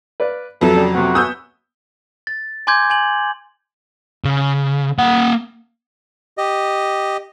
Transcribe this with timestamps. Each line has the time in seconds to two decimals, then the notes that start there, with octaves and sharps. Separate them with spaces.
0.20 B4 D5 F5
0.61 F2 F#3 A4 B4 E5
0.75 C#3 G3
0.95 C3 B3 F#4
1.15 B3 G#5 D#6 E6 F#6 G6
2.27 A6
2.67 G#5 C6 D6 G6 G#6
2.90 G#5 F#7
4.25 C#3
4.99 A#3 F#5
6.38 G4 D#5